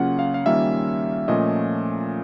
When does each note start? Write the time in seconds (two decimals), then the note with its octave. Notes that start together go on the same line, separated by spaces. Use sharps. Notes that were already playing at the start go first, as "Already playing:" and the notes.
Already playing: C#3 F#3 A#3 C#4 F4 F#5
0.19 F5
0.34 F5
0.46 D#3 G3 A#3 C#4 F4 E5
1.28 A#2 F3 A3 C#4 D#5